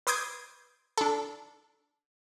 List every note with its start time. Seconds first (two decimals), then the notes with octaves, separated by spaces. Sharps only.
0.07 B4 C6 D6 D#6 G6 G#6
0.98 D4 A4